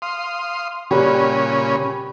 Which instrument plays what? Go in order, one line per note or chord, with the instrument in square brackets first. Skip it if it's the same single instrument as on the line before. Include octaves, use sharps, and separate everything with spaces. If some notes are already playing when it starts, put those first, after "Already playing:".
[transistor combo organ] F5 C6 D#6
[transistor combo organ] A#2 C#3 C#4 [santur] G3 B4